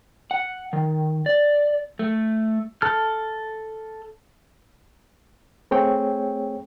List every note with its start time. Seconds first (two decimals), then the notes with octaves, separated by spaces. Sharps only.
0.31 F#5
0.73 D#3
1.26 D5
1.99 A3
2.82 A4 F6
5.71 A3 C4 G#4 C#5 G5